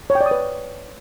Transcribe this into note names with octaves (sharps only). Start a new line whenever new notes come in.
C#5
G5
D5
D#6
B4